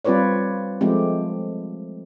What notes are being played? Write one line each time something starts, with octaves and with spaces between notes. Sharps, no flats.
G3 C4 F4 B4 C#5 D5
F3 G#3 A3 C4 G4